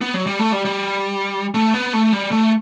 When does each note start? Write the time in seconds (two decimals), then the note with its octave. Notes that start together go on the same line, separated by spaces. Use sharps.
0.01 B3
0.14 F#3
0.26 G3
0.39 A3
0.52 G3
0.65 G3
1.54 A3
1.74 B3
1.93 A3
2.13 G3
2.31 A3